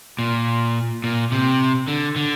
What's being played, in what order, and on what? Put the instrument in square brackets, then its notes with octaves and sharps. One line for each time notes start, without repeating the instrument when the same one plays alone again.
[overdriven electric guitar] A#2
A#2
C3
D3
D3